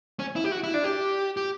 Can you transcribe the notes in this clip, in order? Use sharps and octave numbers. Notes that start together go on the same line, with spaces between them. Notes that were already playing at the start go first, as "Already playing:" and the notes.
C#4
E4
G4
F#4
E4
D4
G4
G4